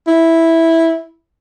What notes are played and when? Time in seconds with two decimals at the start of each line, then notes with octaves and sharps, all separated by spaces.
0.07 E4